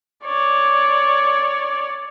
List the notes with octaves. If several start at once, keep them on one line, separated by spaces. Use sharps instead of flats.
C#5 D5